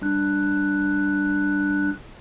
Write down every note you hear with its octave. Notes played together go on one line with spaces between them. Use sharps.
G3 D4 F#6